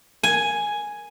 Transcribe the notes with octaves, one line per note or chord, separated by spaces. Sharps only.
G#5